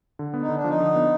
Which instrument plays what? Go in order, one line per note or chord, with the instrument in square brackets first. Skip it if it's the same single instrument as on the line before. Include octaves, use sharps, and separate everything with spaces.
[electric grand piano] D3
B3
[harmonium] D#4
[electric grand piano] D3
[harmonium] D4
[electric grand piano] F3 [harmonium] D#4
[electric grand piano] D3
B3